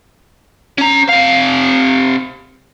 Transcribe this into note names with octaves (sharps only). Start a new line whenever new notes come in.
C#4 A#5
C3 F5